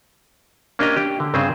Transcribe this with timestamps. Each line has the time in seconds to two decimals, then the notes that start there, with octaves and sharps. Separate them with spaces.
0.79 A#3 C#4 D4 G4 D#5 A#5
0.96 G4
1.20 D3
1.34 G2 C#3 C4 C#4 G#4 C5